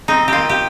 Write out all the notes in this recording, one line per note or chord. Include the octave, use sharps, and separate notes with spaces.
C4 D#4
D#3 F4 G4
G4